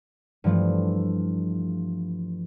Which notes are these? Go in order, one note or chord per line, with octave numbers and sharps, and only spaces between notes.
G2 E3 F3 A3